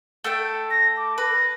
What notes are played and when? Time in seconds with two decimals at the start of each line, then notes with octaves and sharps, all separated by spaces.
0.24 A3 A4 G5
0.70 A#6
0.97 D6
1.18 B4 A#6